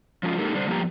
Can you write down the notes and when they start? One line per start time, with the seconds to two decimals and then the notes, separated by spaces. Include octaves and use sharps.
0.23 F3 F#3 G#3 C#4 F4
0.39 G#3 A#3 D#4 G4 A4 A#4
0.54 D3 G3 D4 C5
0.67 G2 F3 A#3 B3 G4 A#5